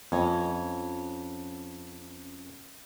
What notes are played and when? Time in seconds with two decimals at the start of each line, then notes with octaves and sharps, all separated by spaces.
0.12 F2 C#4 C#5 D#5